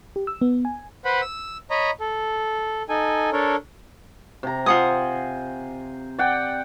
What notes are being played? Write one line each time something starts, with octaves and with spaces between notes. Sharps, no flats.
G4
E6
B3
G#5
B4 C5 F#5 B5
E6
C#5 D#5 A#5 B5
A4
D#4 A4 G#5
D4 A4 A#4 C#5
C3 A#5
F4 C5 F#5 G#5 D#6
D5 F#5 G5